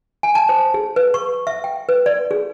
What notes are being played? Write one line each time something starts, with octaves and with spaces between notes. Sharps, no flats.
G#5
A5
C5
G#4
B4
C#6
E5
G5
B4
D5
G#4